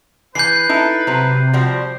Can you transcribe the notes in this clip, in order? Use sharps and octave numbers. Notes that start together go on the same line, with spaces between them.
E3 B4 G#5 G6 C7
D#4 E4 A4
C3 F#3 C5
F3 G3 F#4 C5